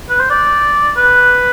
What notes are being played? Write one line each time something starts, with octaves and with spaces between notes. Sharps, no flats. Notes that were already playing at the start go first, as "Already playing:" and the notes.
B4
C5
D5
B4